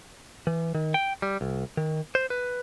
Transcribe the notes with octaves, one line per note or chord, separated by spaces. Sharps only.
E3
D#3
G5
G3
C2
D#3
C5
B4